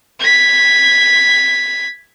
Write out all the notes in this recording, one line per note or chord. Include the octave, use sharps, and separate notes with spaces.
G#6 B6